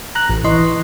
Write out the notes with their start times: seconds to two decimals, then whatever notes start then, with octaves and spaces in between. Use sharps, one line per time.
0.15 A#5 F#6
0.30 A1
0.44 E3 D#5 C6 C#6